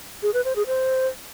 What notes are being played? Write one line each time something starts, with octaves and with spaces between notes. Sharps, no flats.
G#4
B4
C5
G#4
C5